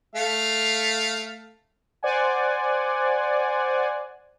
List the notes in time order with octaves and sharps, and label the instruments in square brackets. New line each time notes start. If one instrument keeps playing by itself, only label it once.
[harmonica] A3 F5
[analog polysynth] C5 D5 F#5 G#5